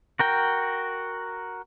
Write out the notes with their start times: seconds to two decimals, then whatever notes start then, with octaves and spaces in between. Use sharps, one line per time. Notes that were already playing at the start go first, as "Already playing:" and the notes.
0.19 F#4 A#4 G5